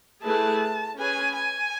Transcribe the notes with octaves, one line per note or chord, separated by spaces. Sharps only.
A3 E4 G#4 B4 A5
C#4 G#4 B4 G#5
G#5